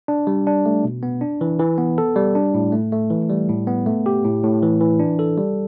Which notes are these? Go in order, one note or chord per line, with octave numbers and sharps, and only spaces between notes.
D4
G3
D4
A3
B2
B3
D4
E3
E3
B3
A4
G3
D4
A2
A3
A3
E3
G3
A2
B3
A3
G4
A2
A2
E3
E3
D4
A4
G3